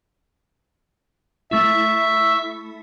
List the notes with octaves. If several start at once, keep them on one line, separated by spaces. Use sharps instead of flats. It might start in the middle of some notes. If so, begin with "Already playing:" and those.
A3 E4 E5 C#6 E6